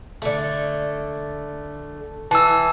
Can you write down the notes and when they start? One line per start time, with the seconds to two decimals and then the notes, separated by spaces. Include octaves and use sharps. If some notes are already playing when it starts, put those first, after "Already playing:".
0.22 D3 A3
2.31 E3 A5 E6